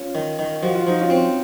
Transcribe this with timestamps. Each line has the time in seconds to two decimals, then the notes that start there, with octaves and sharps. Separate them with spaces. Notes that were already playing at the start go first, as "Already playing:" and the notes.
Already playing: C#4 F4
0.15 D#3
0.39 D#3
0.62 F3 F#4
0.75 F4
0.87 F3 D#4
1.01 C#4 F4
1.10 C4